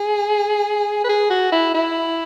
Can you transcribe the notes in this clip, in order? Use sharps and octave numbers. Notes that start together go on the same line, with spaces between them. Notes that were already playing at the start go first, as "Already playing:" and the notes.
Already playing: G#4
B4
G#4
F#4
E4
E4